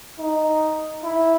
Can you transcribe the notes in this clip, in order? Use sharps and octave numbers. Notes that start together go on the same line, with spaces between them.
D#4
E4